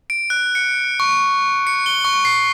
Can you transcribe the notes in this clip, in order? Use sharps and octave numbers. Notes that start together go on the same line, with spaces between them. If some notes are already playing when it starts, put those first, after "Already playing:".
D7
F#6
C#7
C#6
C#7
G7
C#6
C7